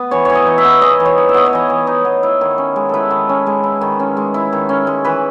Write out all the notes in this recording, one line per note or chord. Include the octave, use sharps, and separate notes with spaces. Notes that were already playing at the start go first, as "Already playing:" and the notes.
Already playing: B3
E3 C#5
E3 C#5
D#5
D#4
E5
B3
E3 D#5
E3
C#5
D#4
E5
B3 D#5
C#5
E3 D#5
E3
D#4
B3
E4
D#3
C#4
G#3
E4 A4 B4
D#3
C#4
G#3
E4
D#3
C#4
G#3
E4
D#3
C#4
G#3
E3 B4